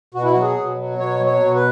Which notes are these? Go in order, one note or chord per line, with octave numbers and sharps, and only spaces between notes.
B2 F#4
E4
F#3 F#4
G#4
B2
F#3
B2 C#5
F#3
C#5
B2
B4